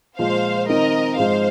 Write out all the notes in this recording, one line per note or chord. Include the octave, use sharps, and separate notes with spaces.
A#2 F3 G#3 C5 F5
D#3 C4 D#4 A#4 D#5
G#2 F3 G#3 D#4 C5 F5